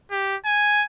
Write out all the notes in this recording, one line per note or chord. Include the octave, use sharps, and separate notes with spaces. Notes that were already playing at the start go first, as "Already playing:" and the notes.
G4
G#5